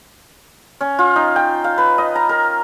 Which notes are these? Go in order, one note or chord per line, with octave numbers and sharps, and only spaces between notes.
C#4
F4
D#4
G5
F5
B4
D#5
A#5
A#4